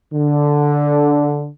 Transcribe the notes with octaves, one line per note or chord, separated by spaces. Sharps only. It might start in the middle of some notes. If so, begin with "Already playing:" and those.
D3